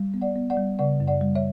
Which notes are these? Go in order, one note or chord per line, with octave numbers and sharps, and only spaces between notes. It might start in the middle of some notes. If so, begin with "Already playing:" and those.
Already playing: G3
B3
D5 F#5
B3
D5 F#5
G3
C#3 D5 F#5
F#2
D5 F#5
G3
C#5 E5